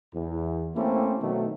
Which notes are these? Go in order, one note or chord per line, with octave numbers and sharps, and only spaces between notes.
E2
A3 A#3 C4 C#4 E4 G4
B2 D#3 F#3 A3